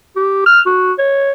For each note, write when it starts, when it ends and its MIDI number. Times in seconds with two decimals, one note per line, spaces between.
0.16 0.43 67
0.46 0.60 89
0.66 0.93 66
0.99 1.32 73